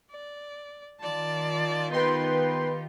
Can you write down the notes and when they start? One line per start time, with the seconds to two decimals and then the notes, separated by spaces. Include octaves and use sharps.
0.11 D5
1.01 D#3 F4 D5 A5
1.92 B3 D#4 G4 B4 G5 C6